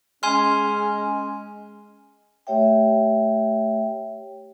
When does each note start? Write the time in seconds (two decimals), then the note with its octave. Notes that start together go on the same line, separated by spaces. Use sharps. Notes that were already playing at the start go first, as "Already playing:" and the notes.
0.23 G#3 C#4 G#5 C6 F6
2.47 A3 G4 C#5 E5 G5